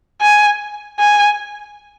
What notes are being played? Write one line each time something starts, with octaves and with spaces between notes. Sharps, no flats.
G#5
G#5